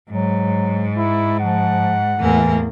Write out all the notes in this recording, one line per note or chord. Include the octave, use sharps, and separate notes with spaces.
G#2 F#3
E4
F3 F#5
E2 A2 E3 A#3